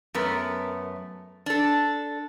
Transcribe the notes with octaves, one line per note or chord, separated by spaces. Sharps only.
F#2 A3 B3 A#4
D4 A4